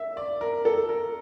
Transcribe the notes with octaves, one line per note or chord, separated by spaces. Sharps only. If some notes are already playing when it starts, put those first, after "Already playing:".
Already playing: E5
D5
A#4
A4
A#4